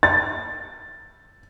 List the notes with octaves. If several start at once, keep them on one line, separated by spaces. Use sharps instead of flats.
A6